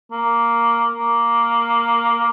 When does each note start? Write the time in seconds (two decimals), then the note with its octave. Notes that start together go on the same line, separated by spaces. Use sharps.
0.11 A#3
0.96 A#3